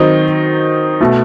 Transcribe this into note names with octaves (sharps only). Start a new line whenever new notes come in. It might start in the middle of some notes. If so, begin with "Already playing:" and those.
Already playing: D#3 F#3 C4 D#4
B2 A3